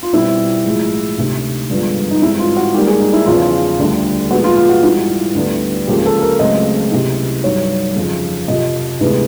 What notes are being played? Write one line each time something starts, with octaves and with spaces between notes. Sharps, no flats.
F4
B2 G3 C4 E4
A2 F3 G#3
D2 C3 D#3
G2 D3 F3 G#3 B3
D#4
G#2 E3 G3 C4 E4
F4
F#4
G#2 D#3 G3 A#3 G4
G#4
D#4
E4
E2 C#3 F3 F4
D2 D3 G3
A#2 F3 G#3 B3 F#4
F4
F4
F#4
G#2 E3 G3 F#4
D2 D3 G3 B3
C#2 C#3 F3 A#3 G4
A4
A#4
C#2 C#3 F#3 A3 C4 D#5
C#2 C3 E3
G2 D#3 F#3 C#5
F2 C#3 F3
F2 C3 F3 D#5
D2 C3 E3 G#3 B3